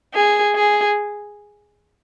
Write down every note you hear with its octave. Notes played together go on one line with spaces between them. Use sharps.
G#4
G#4